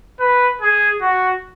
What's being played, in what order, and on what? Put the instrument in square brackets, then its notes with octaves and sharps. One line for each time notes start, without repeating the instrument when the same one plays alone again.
[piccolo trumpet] B4
G#4
F#4